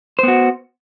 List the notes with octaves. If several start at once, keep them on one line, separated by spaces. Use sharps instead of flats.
B3 F#4 C5